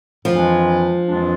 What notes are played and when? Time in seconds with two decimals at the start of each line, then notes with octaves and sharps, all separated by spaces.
0.25 F2 E3 F3 G#3 D4
1.06 F2 E3 G#3 D4